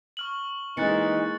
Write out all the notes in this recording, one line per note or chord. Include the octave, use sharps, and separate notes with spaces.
C#6 F6 F#7
E3 G#3 A#3 D#4 F#6 A6 C#7